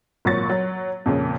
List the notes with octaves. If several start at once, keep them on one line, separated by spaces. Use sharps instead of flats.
G#1 A#2 F#3 C#6 A6
F#3
F2 A#2 C#3